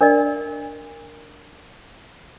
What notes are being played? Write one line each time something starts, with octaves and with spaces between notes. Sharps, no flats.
D4 A#4 D5 D#5